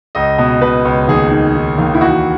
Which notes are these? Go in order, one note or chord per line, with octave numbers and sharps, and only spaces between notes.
C#2 D#5
B2
B2 B4
C#2
D#2 G#4
D#3
D#3
D#2
E4
E3 F#4